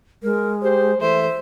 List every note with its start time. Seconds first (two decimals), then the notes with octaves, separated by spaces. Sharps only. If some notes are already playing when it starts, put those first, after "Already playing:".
0.23 G#3 A#4
0.62 G4 C5
1.01 E3 A3 C5 E5